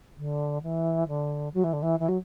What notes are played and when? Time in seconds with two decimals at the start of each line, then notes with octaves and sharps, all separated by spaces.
0.17 D3
0.63 E3
1.08 D3
1.54 F#3
1.63 E3
1.73 D3
1.82 E3
1.99 E3
2.08 F#3